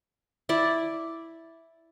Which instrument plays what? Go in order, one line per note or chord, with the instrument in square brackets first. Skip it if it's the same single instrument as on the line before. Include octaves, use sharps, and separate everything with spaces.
[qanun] E4 D5